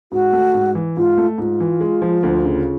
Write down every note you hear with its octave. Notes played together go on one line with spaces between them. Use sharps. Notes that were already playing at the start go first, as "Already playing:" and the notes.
G#2 F#4
A3
G#2
E3
G#2 F4
A3
G#2 F4
E3
G#3
F3
D2
C#3